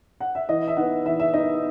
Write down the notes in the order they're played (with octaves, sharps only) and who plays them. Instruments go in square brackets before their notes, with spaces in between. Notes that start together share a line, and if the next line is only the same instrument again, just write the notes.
[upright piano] F#5
E5
E3 D#5
E5
B3 D#4 F#5
E3 E5
E5
B3 D#4 D#5